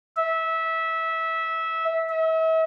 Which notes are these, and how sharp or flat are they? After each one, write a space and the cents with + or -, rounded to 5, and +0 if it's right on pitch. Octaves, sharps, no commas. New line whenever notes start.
E5 -20
E5 -40